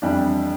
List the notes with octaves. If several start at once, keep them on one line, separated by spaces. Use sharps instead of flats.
F2 E3 G3 D4